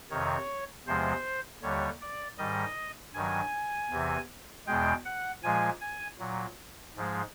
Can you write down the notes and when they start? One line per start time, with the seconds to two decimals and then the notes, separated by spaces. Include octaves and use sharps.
0.10 F2 C3 D#3 C#5
0.86 E2 C3 F3 G#3 C5
1.62 D#2 D3 G3 C#5
2.01 D5
2.38 G#2 D#3 G3 D#5
3.14 G2 D#3 F#3 G#5
3.90 E2 C3 E3
4.67 E2 B2 G#3 G5
5.05 F#5
5.43 A#2 F3 G#3 G#5
5.81 G#5
6.19 A#2 F#3
6.95 G#2 F3 G#3